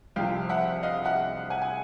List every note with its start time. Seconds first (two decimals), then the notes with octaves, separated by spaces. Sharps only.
0.16 C2 C3 F3 F5 G5
0.49 E5 F#5
0.83 D#5 F5
1.05 E5 F#5
1.50 F#5 G#5
1.62 G#5